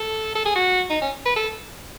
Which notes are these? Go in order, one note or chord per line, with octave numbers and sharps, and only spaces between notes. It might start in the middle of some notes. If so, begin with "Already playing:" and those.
Already playing: A4
A4
G#4
F#4
D#4
C#4
B4
A4